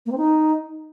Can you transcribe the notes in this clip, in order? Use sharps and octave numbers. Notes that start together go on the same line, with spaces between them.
A#3
C4
D#4